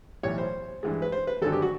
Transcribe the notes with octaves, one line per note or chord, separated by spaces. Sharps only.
B1 A2 E3 G3 C#5
C5
G2 E3 G#3
B4
C5
B4
G#1 G2 D3 F#3 A4
G4
F#4